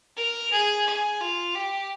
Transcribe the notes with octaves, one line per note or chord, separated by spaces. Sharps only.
A#4
G#4
G#4
F4
G4